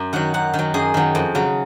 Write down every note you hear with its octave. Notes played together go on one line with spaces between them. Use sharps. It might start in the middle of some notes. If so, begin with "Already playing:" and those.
Already playing: F#2
D#3 F#3 F#5
F#2 F#5
D#3
F#3
F#2 G#4
D#3 F#3
F2
C#3 F#3